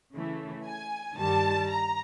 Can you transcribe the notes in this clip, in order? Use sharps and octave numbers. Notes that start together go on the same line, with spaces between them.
C#3 E3 A3
G#5
G2 D#3 G3 A5
A#5